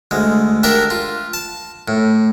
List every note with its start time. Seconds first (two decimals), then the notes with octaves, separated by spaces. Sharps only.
0.11 D2 G#3
0.63 D4 G4 A#4 E5
0.90 F4
1.33 A5
1.88 A2